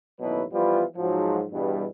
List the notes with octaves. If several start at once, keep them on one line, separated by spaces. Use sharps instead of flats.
A1 D#2 B2 F#3 E4 B4
E3 F3 G3 B3 F4
G#2 F3 F#3
E2 G2 B2 G3